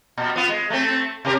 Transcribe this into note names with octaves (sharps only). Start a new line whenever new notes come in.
A#2
B3 F4
G#3
A3 C4
C3 G4 A#4